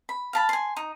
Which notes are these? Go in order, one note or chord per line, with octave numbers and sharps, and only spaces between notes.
B5
F5 A5 B5
G#5 C6
D#4